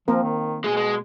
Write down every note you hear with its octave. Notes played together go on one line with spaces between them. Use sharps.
F3 A#3 C4 A#4
D#3
B2 G#3 G#4
G#3